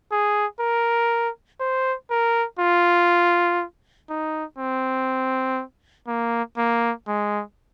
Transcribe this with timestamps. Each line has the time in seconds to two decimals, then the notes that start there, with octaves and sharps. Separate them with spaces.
0.11 G#4
0.60 A#4
1.60 C5
2.10 A#4
2.59 F4
4.09 D#4
4.58 C4
6.08 A#3
6.57 A#3
7.08 G#3